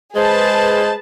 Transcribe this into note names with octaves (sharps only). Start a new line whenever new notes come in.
G#3 G#4 B4 C5 A5